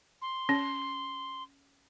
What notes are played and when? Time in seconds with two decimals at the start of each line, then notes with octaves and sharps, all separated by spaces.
0.21 C6
0.49 C#4